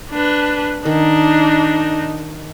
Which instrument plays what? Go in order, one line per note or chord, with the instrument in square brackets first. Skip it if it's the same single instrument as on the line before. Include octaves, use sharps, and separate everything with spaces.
[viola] D4 B4
[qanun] D#3 [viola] D4 D#4